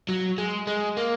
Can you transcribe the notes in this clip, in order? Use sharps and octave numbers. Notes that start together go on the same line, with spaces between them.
F#3
G#3
G#3
A#3